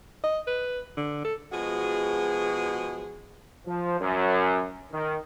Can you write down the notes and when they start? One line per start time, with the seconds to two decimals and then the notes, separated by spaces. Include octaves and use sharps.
0.24 D#5
0.47 B4
0.97 D3
1.25 A4
1.53 B2 F3 G#3 F#4 G#4
3.67 F3
3.99 F#2
4.92 D#3